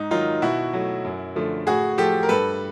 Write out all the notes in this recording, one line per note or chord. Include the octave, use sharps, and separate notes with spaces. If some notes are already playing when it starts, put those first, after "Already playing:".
Already playing: G#2 D#4
D#3 F#3 D#4 F4
B2 E4 F#4
F#3 A3
F#2
D3 F3 A3
A2 F#4 G#4
F3 A3 G4 A4
A#4
G2 A4 B4